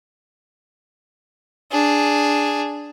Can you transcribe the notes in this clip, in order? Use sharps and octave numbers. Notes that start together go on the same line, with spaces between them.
D4 G#4